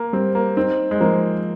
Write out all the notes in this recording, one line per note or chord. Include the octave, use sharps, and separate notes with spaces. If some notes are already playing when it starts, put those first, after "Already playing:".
Already playing: A#3
G3 C4
A#3
C4 D#4
G#3
F3 A#3